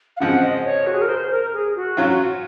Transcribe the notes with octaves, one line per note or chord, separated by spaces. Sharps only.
F5
C#3 F3 G#3 C4 F#5
D#5
C#5
F#4
G#4
A#4
C5
A#4
G#4
F#4
F#3 C#4 F4